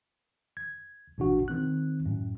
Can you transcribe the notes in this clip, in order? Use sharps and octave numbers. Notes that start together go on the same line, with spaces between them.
G#6
A1 B2 D4 F#4
D#3 C4 F#6
F#2 A2